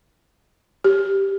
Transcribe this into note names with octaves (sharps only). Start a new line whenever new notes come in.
G4